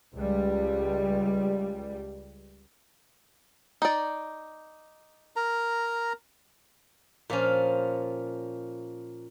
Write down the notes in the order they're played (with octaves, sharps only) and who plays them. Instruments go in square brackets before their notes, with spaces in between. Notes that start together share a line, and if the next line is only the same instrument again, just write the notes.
[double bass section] C#2 G3
[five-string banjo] D#4 D5
[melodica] A#4 A#5
[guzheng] A#2 F3 C#4